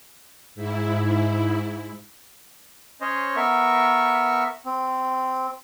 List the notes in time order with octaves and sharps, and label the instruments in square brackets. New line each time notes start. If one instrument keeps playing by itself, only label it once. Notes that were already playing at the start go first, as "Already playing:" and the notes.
[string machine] G#2 E4
[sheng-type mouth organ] C#4 C5 C#5 D#5
B3 A#4 E5 C#6
C4